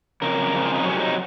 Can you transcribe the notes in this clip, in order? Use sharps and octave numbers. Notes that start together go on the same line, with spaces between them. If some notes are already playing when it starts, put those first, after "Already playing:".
F2 C#3 A#4
F2 C#3 F3
F4
D#4
F2 C3 F#3 C#4
D#4